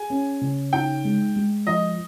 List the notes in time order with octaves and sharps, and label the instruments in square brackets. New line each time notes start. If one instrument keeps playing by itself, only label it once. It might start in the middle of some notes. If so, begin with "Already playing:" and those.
Already playing: [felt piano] G#4 [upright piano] G#5
[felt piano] C#4
C#3
[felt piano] D#4 [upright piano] G5
[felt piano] G#3
G#3
[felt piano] F3 [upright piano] D#5